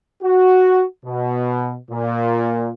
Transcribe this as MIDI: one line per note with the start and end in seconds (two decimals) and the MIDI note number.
0.23 0.83 66
1.06 1.76 47
1.91 2.70 46